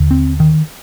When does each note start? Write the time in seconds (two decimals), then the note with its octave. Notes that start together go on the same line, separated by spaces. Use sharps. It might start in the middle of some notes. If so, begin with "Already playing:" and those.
Already playing: D#2 D3
0.11 C4
0.40 D#3